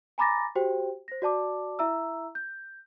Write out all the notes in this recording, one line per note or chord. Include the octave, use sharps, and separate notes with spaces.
G#5 A#5 B5 D6 A6 A#6
F#4 G4 C5 G5
C5 A#6
F#4 D5 A5 D6
E4 E5 A#5 E6
G6